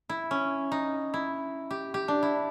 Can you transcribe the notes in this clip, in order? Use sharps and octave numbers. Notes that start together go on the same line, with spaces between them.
E4
C#4
D#4
E4
G4
G4
D4
E4